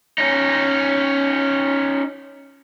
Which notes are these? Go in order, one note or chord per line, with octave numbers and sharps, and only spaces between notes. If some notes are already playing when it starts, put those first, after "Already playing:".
C#4 D#4